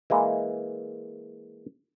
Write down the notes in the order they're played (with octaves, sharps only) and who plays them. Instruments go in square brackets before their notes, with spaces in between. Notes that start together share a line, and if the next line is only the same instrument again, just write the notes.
[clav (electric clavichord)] E3 G#3 A#3